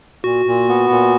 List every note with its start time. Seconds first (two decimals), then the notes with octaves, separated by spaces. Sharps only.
0.24 A#2 F#4
0.46 A#2
0.68 B3
0.90 A#2